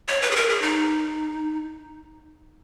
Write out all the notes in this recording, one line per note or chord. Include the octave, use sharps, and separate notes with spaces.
C#5
B4
G#4
A#4
G#4
D#4